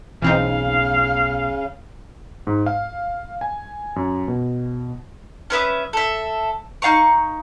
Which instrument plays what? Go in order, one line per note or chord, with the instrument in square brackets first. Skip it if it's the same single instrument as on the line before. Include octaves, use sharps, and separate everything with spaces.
[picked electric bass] B1 [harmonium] C#3 [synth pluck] E3 C4 D#4 [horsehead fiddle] F5
[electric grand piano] G#2
F5
G#5
F#2
B2
[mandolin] C#4 B4 E5 D#6
A4 E5
D#4 F5 A#5 C#6